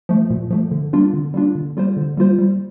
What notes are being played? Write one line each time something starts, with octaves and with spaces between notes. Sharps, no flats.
F3 A3
A#2
F3 A3
D3
G3 A#3 D4 F4
D3
G3 A#3 D4 F4
D3
G3 A#3 F4 C5
D3
G3 A#3 F4 C5
G3